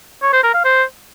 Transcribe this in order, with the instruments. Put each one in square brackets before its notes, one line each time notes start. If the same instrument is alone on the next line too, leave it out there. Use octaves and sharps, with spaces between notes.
[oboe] C#5
C5
A#4
F5
C5